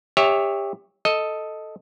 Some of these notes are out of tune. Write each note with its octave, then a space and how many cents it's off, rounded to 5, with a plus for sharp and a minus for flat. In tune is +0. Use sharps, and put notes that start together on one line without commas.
G4 +25 C#5 +0 E5 -20
A4 +0 D#5 +5